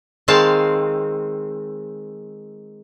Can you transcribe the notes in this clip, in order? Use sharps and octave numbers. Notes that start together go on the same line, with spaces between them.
D#3 G#3 C4 F5 A5